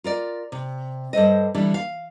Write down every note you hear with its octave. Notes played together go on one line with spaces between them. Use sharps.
F4 A#4 D5
C3
G2 A4 C5 D#5
D3 E3 G3 D4
F5